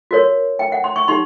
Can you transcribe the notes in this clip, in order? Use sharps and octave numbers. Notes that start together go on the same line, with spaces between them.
F#4 A#4 C#5
G5
F#5
C6
C#6
D#4 G4 C6